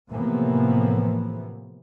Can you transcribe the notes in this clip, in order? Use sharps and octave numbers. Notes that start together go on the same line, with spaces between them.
A2 C3 E3 F3 A#3 B3